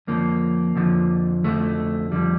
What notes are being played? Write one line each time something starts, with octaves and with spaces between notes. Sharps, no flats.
F2 D3 F3 A#3
F2 D3 F3
F2 D3 F3 A3
F2 D3 F3 G3